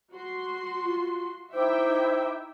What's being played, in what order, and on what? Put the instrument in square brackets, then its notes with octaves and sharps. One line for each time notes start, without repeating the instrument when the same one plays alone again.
[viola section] F#4 C6
[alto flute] F4
[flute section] D#4 E4 D6 [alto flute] C5 [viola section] E5 G5